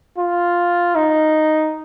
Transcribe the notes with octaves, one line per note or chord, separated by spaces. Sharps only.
F4
D#4